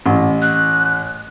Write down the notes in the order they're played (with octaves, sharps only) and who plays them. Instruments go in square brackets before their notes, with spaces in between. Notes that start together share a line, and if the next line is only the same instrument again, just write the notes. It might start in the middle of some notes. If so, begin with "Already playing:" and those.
[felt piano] A1
[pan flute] F#6